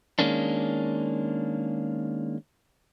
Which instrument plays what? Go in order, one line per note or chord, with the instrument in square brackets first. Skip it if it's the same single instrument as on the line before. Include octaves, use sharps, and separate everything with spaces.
[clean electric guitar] D#3 G#3 A#3 C#4 D4